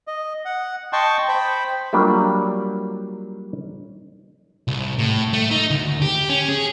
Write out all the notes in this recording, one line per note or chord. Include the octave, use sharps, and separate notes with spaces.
D#5
F#5
D#5 G5 A5 C6 C#6
C5 G5 B5
F#3 G3 A#3 D4 F4
C2
A2
A3
D#4
D2
G4
C#4
G#4